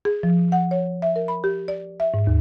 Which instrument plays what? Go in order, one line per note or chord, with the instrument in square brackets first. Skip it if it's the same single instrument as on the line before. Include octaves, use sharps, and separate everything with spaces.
[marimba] G#4
F3
F#5
C#5
E5
A#4
B5
G4
D5
E5
G#2
D#2